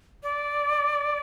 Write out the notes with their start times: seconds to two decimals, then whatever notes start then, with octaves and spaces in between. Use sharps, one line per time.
0.23 D5